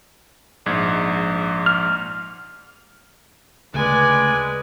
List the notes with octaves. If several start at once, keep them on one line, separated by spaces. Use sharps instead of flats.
A#1 G#2 G#6
F6
D2 C#3 G#3 A3 B4 D5 G#5